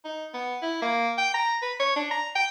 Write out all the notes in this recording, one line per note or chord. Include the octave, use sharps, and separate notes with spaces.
D#4
B3
E4
A#3
G5
A#5
B4
C#5
D4
A#5
G5